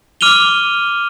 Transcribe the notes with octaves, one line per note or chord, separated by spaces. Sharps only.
D6 F6 D#7 F7 G7